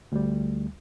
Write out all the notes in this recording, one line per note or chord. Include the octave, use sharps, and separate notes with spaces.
D2 G3